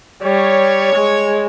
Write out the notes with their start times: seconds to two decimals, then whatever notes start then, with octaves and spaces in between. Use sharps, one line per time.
0.22 G3 C#5
0.95 G#3